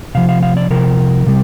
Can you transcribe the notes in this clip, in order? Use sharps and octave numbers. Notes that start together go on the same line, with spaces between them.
C3 F3 F5
F5
F5
D5
C3 F3 A#4
C3 G3